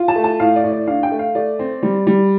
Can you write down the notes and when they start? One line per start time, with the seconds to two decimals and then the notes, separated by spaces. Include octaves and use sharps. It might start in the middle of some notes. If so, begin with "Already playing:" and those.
Already playing: F4
0.08 A5
0.16 A3
0.24 A5
0.40 A2 F5
0.56 D5
0.64 A2
0.72 D5
0.87 D4 F5
1.03 G5
1.12 A3
1.19 F5
1.35 A3 D5
1.59 C4
1.83 G3
2.07 G3